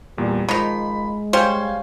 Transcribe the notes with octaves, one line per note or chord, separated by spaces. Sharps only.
E2 A#2 G3
D#3 F3 G#3 B5
G3 C#4 C5 F5 G5 G#5